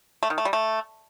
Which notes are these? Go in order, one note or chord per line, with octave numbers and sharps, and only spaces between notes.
A3
D#3
A3
G3
A3